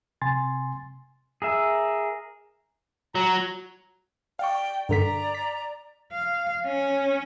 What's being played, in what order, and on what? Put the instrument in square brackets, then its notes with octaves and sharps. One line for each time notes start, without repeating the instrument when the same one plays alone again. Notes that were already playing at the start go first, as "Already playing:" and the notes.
[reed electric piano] C3 G#5 C6 A6
[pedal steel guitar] G#4 A#4 E5
[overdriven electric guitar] F#3 [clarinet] A#5
[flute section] D5 G5 [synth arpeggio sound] F5 C#6
[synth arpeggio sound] G2 D3 B6 [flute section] D5 A#5
[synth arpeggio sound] B6
[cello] F5
C#4